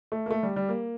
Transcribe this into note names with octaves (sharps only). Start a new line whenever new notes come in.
A3
A#3
A3
G3
G3
A#3